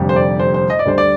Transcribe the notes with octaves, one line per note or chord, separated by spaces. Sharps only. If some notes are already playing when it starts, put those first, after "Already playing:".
Already playing: F1 F2 D3 G3
C5
D5
C5
C5
D#5
D5
D2 D3 G3 C5
D5